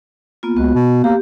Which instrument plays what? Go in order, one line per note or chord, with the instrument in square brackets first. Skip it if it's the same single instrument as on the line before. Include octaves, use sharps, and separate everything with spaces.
[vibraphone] A#3 B3 F4
[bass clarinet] C#2 [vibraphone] B3 F#4
[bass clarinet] B2
[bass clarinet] A#3 [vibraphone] G4